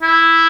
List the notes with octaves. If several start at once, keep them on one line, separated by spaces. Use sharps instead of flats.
E4